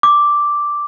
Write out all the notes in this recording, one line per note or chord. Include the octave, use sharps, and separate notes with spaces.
D6